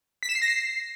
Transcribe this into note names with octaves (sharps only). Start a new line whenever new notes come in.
B6
E7
C7
A#6
C7